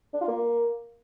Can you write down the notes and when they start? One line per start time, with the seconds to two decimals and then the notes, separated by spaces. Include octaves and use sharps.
0.14 D4
0.21 F4
0.28 A#3